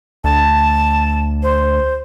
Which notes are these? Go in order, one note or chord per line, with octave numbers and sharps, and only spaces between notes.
D2 A5
C5